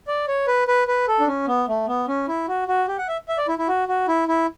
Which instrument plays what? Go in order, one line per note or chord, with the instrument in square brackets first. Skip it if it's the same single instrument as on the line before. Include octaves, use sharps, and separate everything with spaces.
[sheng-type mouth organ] D5
C#5
B4
B4
B4
A4
D4
C#4
B3
A3
B3
C#4
E4
F#4
F#4
G4
F#5
E5
E5
D5
E4
E4
F#4
F#4
E4
E4